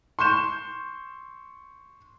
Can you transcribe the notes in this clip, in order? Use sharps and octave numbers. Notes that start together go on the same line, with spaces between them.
C6 C#6 G6 E7